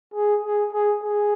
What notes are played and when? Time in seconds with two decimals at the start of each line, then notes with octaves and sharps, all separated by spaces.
0.14 G#4
0.43 G#4
0.73 G#4
1.03 G#4